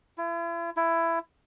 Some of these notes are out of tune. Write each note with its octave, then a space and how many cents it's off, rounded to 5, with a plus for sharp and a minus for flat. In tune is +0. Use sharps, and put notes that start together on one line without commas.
E4 +40
E4 +15